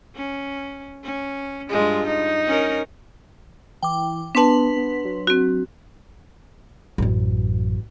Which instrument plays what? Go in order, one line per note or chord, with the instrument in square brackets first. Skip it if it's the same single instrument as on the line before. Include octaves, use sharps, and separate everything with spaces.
[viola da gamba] C#4
C#4
[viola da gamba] G2 F4 [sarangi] G#3
[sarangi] D#4
[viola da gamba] C#4 A#4
[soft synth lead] E3 [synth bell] G5 D6
[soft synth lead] B3 [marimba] D4 A5 [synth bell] B4 C6 B6
[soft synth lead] B3
F#3
[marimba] C4 F#4
[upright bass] A1 F#2